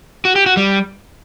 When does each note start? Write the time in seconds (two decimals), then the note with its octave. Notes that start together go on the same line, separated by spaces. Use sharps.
0.25 F#4
0.36 G4
0.46 F#4
0.57 G3